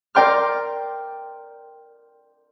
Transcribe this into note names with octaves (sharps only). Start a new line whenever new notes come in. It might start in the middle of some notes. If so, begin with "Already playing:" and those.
A#4 D5 G5 C6 F6